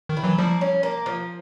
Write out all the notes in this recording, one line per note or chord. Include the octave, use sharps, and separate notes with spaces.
D#3
E4
E3 F#3
F3 G3 A#3
C#4
A#3
F3